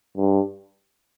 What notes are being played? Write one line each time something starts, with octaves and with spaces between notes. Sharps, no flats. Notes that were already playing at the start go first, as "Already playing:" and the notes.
G2